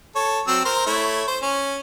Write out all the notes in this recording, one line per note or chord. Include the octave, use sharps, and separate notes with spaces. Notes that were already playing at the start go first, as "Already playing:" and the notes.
A4 C#5
F#3 C4 E6
A#4 C5 A#5
A3 E4 C#5
C5
C#4